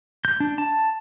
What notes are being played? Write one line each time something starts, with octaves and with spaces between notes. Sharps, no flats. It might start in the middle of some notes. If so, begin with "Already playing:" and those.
G6
D4
A5